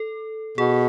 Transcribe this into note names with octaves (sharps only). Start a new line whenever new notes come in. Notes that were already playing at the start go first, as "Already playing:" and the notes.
Already playing: A4
B2 G#4